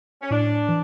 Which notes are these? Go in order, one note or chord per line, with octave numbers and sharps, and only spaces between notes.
C#4
A2 D4
E3